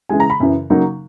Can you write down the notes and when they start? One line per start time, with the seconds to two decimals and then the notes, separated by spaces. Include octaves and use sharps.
0.09 C#3 E3 G#3 G#5
0.20 A#5
0.30 B5
0.40 F#2 C#3 E3
0.70 C#3 F#3 A#3 D#4